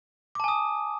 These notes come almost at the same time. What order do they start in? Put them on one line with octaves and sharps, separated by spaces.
D6 A5 G#5 D#6